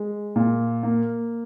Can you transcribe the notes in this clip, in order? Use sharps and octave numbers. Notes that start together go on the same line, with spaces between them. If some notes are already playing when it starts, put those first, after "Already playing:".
Already playing: G#3
A#2
A#3